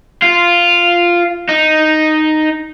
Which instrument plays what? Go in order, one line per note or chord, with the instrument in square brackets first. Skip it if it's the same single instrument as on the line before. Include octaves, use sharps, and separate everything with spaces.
[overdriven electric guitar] F4
D#4